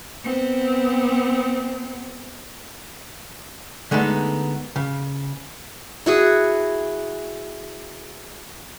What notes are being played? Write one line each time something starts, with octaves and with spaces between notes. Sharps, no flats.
B3 C4
D3 G#3 A3 B3 D#4
C#3
E4 F#4 G#4